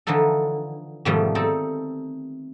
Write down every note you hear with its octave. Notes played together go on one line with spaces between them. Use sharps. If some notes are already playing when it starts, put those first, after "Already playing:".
D3 E3 F3 D#4 A4
G#2 B2 D#3 F3 G3 A3
C4 D#4 A4